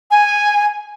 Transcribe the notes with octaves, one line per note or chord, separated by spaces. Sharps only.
G#5